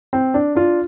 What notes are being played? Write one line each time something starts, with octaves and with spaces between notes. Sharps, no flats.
C4
D4
D4 F4